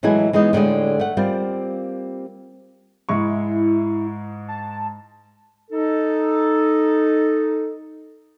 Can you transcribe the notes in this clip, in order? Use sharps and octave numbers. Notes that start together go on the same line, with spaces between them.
A2 E3 F#3 G#3 E4 G#5
E3 G#3 B3 D#4
A2 D3 G3 G#3
A3 F#5
G3 A#3 C4 F4
G#2 G#3 E4 C#6
A5
D#4 A4